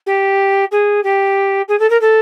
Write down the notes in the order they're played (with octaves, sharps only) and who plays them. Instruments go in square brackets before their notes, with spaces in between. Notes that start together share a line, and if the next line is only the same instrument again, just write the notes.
[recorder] G4
G#4
G4
G#4
A4
A#4
A4